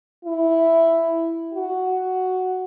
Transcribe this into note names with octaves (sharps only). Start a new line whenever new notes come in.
E4
F#4